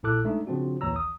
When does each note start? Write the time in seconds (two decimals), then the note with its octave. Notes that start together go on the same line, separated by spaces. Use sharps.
0.03 A#1 A#2 E4 A4 D6 F#6
0.24 G#3 A3 D4 D#4
0.47 C#3 F3 C4 D4 F#4
0.81 A#1 D#2 E3 C#5 A#5 E6
0.96 D#6